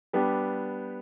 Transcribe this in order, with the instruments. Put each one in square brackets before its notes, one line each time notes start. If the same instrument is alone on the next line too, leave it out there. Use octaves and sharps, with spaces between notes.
[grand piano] G3 B3 D4 G4